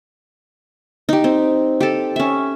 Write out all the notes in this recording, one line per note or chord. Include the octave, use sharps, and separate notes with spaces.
D#4 G4
C4
G4 A4
C#4 E5